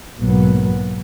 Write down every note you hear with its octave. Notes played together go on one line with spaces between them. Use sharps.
B1 G#2 B2 F#3 A#3 B3